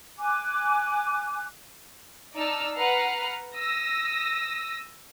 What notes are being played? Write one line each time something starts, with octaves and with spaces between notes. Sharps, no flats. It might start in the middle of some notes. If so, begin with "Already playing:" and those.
G#5 D6 F#6
D#4 D5 A5 E6 F6
B4 F#5 A#5 F6 C7
D#6 E6 A#6